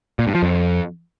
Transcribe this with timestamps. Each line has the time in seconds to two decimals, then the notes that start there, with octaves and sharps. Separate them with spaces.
0.19 A#2
0.27 G2
0.35 F3
0.43 F2